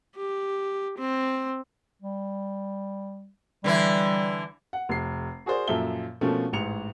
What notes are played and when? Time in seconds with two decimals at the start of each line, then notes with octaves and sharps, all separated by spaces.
0.17 G4
0.98 C4
2.02 G3
3.64 D3 E3 G3 E4
4.73 F#5
4.89 F1 C7
5.46 F#4 G#4 A#4 C5 D5
5.68 F#2 A#2 F3 A4 E5 G7
6.21 B2 F3 A3 A#3 C4 C#4
6.53 A1 G#2 C#7 F7